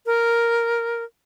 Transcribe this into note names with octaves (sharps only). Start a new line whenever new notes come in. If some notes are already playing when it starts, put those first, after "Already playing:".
A#4